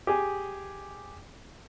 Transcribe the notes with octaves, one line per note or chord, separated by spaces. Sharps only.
G4 G#4 G#5